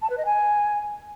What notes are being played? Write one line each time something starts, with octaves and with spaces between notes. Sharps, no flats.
A5
B4
D#5
G#5